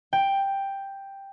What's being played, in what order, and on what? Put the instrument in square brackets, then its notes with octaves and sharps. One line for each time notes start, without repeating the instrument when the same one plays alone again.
[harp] G5